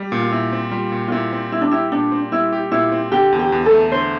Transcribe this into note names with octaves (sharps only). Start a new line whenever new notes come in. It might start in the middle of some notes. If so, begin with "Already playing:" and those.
Already playing: G3
A#2
F4
A#2 E4
C4
G3 F4
A#2
F4
A#2 E4
C4
G3 E4
D4
E4 G4
A#2 D4
C4
G3 E4
G4
A#2 E4
C4
D3 G4
E2
G4
E2
A4
A3
D3 C5